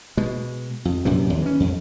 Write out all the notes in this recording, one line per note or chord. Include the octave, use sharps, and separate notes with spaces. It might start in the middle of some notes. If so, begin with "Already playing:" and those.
B2 G#3
F2
A#1 F#2 C3 E3
D#2
E3 C#4
F2